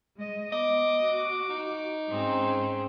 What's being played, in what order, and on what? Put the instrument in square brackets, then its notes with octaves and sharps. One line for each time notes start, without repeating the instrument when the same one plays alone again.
[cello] G#3 D#5
[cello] B3 [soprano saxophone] D#5 [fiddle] D6
[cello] F#4
[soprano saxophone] D#4
[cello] G#2 C#4 [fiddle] C4 G#4